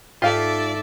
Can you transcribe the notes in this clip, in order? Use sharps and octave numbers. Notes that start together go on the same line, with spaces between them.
G#2 F4 G4 A4 D5 E5 F5